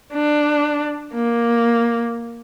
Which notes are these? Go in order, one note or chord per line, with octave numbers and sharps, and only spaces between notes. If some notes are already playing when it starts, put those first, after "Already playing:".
D4
A#3